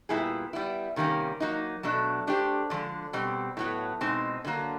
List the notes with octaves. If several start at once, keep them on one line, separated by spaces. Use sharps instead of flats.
A#2 G3 B3 E4 G#4
G3 B3 E4
C3 D#3 G3 A#3 C#4
F#3 A#3 D#4
B2 F#3 A3 D4
A3 D4 G4 C5
D3 F3 G#3
B2 G3 C4
A2 F#3 B3
B2 G#3 C4 D#4
D3 F#3 A#3